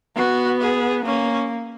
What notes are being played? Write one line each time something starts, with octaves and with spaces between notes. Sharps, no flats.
B3 F#4
G#4
A#3 C#4